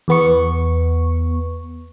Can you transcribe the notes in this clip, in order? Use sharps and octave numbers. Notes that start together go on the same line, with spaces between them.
E2 B3 C#6